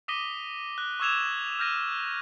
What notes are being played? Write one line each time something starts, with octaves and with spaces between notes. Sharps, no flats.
D6 D#6 A#6 B6 D#7 G7
F#6
C#6 D6 E6 G#6 E7 F7
F6 G6 A#6 D#7